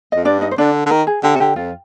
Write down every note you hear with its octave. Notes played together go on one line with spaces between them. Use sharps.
F2 D#5
G2 D4 D5
D#4 D#5
C5
D3 D4 D5
D3
D#3 A#4
G#4
D3 G4
C3
D3 G4
F2 F4